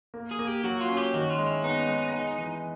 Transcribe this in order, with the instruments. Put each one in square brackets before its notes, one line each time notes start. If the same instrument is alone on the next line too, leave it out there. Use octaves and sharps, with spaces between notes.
[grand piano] A#3
[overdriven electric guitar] G#4
[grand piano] A#3
[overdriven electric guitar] G4
[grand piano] F#3 [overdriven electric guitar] F#4
[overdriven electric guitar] F4
[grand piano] C#4
[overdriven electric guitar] G4
[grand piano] D#3 [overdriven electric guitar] F#4
[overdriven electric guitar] F4
[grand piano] G#3
[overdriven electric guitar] E4
[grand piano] B3 [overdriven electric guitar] D#4
[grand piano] G#3
G#3
E3